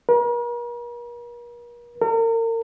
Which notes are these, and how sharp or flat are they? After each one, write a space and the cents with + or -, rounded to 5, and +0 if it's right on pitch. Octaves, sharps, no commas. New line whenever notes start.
A#4 +45
A#4 -35